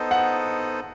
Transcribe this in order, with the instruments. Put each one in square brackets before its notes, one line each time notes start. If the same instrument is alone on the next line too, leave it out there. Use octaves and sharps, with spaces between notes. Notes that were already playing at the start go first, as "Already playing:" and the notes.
Already playing: [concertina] B3 D#4 A4 C5 D#5
[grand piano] F#5